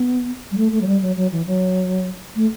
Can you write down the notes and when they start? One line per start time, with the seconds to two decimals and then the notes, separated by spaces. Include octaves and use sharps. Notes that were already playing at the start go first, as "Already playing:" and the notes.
Already playing: B3
0.52 G3
0.57 A3
0.72 A3
0.81 F#3
0.87 G3
1.02 F#3
1.17 F#3
1.32 E3
1.47 F#3
2.36 A3